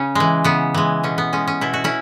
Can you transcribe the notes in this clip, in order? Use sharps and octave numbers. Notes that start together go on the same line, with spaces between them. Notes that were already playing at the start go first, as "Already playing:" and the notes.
Already playing: C#3 C#4
E3 G#3
C#3 B3
E3 G#3
B2 C#4
B3
G#3 C#4
C#4
B2 E4
F#4
C#4 E4